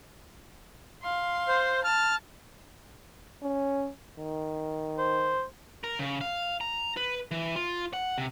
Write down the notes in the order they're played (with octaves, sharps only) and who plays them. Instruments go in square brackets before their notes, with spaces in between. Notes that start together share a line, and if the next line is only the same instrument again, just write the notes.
[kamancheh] F5 C6
[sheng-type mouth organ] C5
[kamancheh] A5 [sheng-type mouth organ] F6
[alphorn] C#4
D#3
[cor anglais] C5
[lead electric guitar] A#4
C#3
F5
A#5
B4
E3
F4
F#5
C3